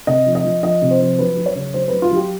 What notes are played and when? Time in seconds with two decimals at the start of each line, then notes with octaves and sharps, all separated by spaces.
0.07 C3 D#5
0.26 F3
0.35 D#5
0.44 F3
0.63 F3 D#5
0.82 C3
0.91 C5
1.00 F3
1.19 F#3 B4
1.37 F#3
1.46 C#5
1.55 C#3
1.74 F#3 C5
1.88 F#3 B4
2.02 F4
2.11 F#3 G4